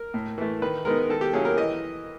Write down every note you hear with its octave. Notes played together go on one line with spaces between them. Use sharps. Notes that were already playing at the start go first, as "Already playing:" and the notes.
Already playing: A#4
A2
E3 A3
D#3 B4
G#3 B3 D#4 A#4
D#3 A4
G4
F#3 A#3 C#4 E4 G#4
A#4
E3 D#5